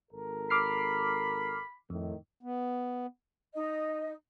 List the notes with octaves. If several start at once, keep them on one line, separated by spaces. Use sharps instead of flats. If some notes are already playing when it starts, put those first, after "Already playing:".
G#1 A4 A#4
B5 D6 F6 C7
F2 A2 D#3
B3
D#4 D#5